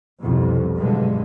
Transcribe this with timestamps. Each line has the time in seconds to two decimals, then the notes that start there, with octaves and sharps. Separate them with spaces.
0.21 C2 F2 B2
0.77 B1 G2 D3 G#3